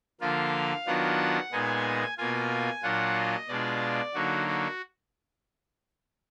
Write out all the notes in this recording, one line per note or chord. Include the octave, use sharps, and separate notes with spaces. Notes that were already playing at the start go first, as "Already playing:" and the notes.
D3 F3 A#3 F4 F5
D#3 F#3 B3 D4 F4 F#5
A#2 G#3 B3 D#4 G#5
B2 A#3 F4 G#5
A#2 F#3 D4 F4 F#5
D#5
B2 G#3 D4 F4 D5
D3 F#3 A#3 D#4 F#4
F#4